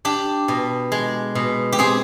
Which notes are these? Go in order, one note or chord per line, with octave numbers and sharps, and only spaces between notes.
D4 G4
B2
G#3
B2
G4
C4 G#4